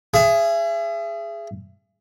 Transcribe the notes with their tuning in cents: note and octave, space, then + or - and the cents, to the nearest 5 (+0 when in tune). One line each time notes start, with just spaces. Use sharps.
G#4 +0 E5 +35